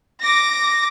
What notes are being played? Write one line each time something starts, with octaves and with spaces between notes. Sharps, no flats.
D6 A#6